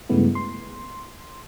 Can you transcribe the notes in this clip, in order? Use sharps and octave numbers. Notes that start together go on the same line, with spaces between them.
G2 C#3 G#3 A3 B3 E4
C6